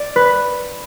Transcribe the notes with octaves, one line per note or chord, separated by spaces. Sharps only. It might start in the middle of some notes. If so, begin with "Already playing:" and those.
Already playing: D5
B4